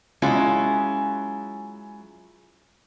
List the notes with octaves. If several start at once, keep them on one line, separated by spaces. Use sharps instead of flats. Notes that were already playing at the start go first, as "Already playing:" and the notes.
F#3 G#3 C#4 E4 F4